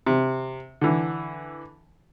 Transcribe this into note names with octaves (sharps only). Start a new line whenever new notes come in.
C3
D3 E3